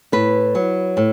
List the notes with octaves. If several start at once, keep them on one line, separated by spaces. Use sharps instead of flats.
A2 B4
F#3
A2